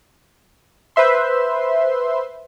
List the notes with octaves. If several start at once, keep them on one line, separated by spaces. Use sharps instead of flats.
B4 C5 E5 C6